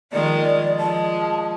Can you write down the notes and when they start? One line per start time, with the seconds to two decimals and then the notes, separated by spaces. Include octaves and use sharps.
0.13 D#3 F3 G#3 D5
0.78 F3 G#3 A5